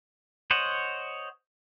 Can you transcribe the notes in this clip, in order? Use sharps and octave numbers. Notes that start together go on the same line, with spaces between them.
C5 C#5 D#5 F#5